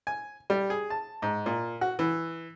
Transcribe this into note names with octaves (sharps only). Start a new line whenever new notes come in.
G#5
G3
G#4
A5
G#2
A#2
F#4
E3